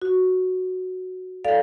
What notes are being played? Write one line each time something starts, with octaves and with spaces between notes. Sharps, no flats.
F#4
A4 D5 F5